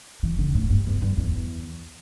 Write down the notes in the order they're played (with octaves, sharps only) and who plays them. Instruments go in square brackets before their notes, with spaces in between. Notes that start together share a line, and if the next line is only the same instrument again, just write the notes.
[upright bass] E3
D3
A2
G2
E2
G2
E2